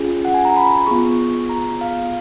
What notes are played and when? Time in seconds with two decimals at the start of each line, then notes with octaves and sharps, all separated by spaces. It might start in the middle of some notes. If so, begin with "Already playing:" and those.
Already playing: C#4 F4 G#4
0.25 F#5
0.34 G#5
0.45 A#5
0.56 B5
0.87 B3 F4 G#4 C#6
1.49 A#5
1.81 F5